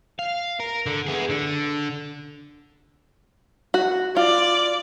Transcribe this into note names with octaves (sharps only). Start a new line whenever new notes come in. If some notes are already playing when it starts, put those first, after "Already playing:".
F5
A#4
D3
B3 G#4
D3
F#4
F4 D5